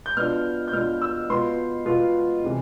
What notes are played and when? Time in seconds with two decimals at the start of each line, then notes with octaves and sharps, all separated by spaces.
0.06 G6
0.17 B2 B3 D4 F4 F6
0.68 G6
0.73 B2 B3 D4 F4 F6
1.02 E6
1.30 B2 B3 F4 C6
1.85 B2 B3 F4
2.44 C3 E3